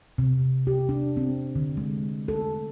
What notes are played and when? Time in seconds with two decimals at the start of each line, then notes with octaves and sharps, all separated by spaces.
0.18 C3
0.67 G4
0.89 D4
1.17 C4
1.56 D3
1.77 G#3
2.28 A4